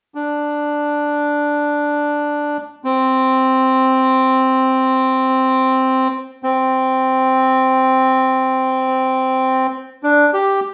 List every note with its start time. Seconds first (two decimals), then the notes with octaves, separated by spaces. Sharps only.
0.15 D4
2.84 C4
6.43 C4
10.03 D4
10.33 G4